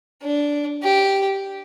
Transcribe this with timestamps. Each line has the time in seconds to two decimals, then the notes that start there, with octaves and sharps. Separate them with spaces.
0.23 D4
0.83 G4